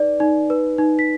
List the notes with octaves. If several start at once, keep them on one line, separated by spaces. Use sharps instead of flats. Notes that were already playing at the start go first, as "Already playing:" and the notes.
Already playing: D#4 B4 D5
D#4
B4
D#4
B6